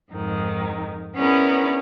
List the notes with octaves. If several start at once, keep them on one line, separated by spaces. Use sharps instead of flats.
F2 G#2 D#3
B3 C#4 E4 G#4 A#4 D5